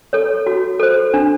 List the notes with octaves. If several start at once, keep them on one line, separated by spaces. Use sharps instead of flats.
A4 C#5
F#4
A4 C5
D4